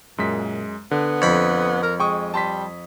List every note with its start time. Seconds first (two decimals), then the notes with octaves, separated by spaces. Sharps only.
0.18 F#2 A#2 G#3 B6
0.91 D3 B3
1.22 F2 B5
1.83 A#4
2.00 G#3 G5 C#6 D#6
2.34 G3 A5 C6 B6